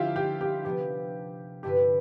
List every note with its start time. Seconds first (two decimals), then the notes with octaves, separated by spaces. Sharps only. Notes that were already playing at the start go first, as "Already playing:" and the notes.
Already playing: D3 F3 A3 E4 F4 G4
0.16 G4
0.41 G4
0.65 C3 F3 B3 D4 G4
1.63 G2 D3 A3 E4 G4 B4